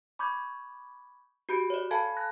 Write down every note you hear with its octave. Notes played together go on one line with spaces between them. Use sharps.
B5 C#6 D6 G6 G#6
F#4 G4 B5 G6 C#7 D7
C#5 D5
A4 F5 G#5 A5 B5 G#6
F#6 A#6